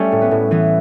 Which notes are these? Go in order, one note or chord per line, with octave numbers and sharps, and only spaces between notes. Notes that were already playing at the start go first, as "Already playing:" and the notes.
Already playing: G3 A3 C#4
A2
B3
A2
E3 B3